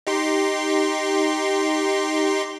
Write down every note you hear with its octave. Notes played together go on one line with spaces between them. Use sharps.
D#4 G4 C6